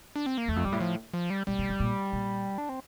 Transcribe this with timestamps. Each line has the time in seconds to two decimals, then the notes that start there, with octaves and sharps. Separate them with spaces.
0.16 D4
0.26 C4
0.38 A#3
0.48 E2 A3
0.56 F2
0.65 G2 G3
0.72 A2
0.81 F3
1.14 F3
1.30 G3
1.47 A#2 G3
1.59 A#2
1.69 A2
1.80 A#2
2.13 A#2
2.58 D4
2.69 C4